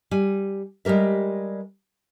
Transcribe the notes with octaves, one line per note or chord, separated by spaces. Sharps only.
G3 G#5
G3 G#3 G4 A#4 E5